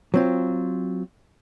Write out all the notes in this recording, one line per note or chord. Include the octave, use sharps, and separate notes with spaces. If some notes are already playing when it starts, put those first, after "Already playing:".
F#3 C4 F4